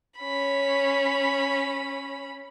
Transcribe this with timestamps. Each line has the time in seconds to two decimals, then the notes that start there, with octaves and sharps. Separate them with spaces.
0.21 C#4 B5